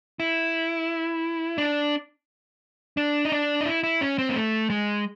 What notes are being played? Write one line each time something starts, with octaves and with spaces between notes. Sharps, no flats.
E4
D4
D4
D#4
D4
D#4
E4
E4
C#4
C4
A#3
A3
G#3